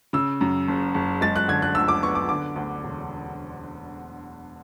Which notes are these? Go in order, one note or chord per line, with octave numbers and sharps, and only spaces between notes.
C#3 E6
F#2
F#1
F#1
G#3 A6
F#6
D3 G#6
F#6
D2 E6
D6
B3 C#6
D6
D3 D6
D2
E1